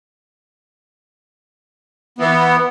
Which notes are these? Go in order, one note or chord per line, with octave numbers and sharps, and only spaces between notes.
E3 B3